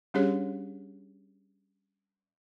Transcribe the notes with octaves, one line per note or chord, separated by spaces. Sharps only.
G3 C#4 D4 G4 G#4 C#5